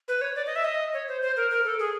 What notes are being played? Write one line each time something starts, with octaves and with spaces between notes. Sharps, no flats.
B4
C#5
D5
D#5
E5
D#5
C#5
C5
C5
A#4
A#4
A4
G#4